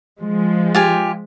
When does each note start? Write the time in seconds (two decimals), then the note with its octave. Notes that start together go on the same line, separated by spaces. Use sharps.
0.20 F3 G#3
0.75 F4 G4 G#5